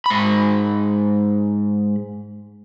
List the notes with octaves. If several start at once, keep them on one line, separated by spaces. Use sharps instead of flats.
G#2 B5